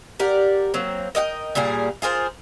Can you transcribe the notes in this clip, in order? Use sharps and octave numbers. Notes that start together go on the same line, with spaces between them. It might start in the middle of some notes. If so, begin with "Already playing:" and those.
G4 A#4 D5 F#5
F#3 A#3 C4
A#4 D#5 F#5 G5
A#2 G3 A#3 G#4
F4 G#4 A#4 C5